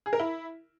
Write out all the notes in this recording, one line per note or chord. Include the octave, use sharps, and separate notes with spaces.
G#4
A#4
E4